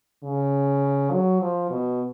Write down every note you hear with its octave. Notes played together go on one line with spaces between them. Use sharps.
C#3
F#3
F3
B2